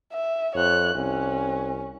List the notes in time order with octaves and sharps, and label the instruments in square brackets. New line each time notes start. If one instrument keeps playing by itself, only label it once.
[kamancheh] E5
[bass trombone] F2 [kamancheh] C#5 F#6
[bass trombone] C2 [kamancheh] C#4